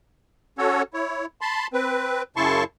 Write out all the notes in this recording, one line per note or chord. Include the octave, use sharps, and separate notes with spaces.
C#4 F#4 A4 C#5
E4 C#5
A5 B5 C6
C4 B4
F#2 C#3 E4 A5 C6 C#6